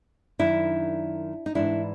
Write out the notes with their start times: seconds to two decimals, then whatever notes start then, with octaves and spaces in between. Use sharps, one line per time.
0.39 F#2 D#3 D4 E4
1.46 D#4
1.55 G#2 E3 D4 E4